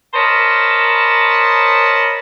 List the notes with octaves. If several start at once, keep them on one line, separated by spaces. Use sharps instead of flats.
A#4 C5 C#5 D#5 A5 B5